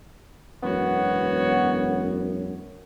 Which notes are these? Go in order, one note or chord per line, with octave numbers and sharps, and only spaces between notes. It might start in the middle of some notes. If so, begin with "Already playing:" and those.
E1 F#2 B3 F#4 C#5